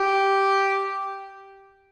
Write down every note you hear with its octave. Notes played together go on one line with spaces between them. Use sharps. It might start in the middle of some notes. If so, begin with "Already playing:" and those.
Already playing: G4